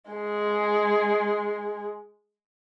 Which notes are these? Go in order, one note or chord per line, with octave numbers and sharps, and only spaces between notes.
G#3 G#4